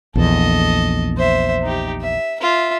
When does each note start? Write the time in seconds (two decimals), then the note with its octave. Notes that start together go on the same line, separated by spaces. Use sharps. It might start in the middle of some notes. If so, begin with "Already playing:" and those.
0.15 A#1 E2 A4 D#5
1.17 C5 E5
1.63 D#4 G4
2.01 E5
2.40 F4 E5